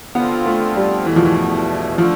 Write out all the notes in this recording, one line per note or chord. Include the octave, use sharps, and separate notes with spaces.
D3 F3 B3 C4 F4
A3
G3
E2 B2 E3 A3
F3
E3
D3 F3 A3